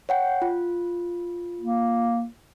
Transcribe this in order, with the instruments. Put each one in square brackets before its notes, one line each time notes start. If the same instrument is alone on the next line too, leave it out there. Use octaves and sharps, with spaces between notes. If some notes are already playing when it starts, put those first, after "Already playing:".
[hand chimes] C#5 F#5 G5
F4
[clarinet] A#3